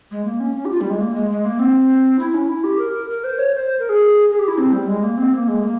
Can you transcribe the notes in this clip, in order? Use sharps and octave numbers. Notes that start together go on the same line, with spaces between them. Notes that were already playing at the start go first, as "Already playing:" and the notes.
G#3
A#3
C#4
C#4
G4
F4
G3
G#3
A#3
G#3
G#3
A#3
C4
E4
C#4
E4
G4
A#4
A#4
C5
C#5
C5
A#4
G#4
G#4
G4
E4
C4
G3
G#3
A#3
C4
A#3
G#3
A#3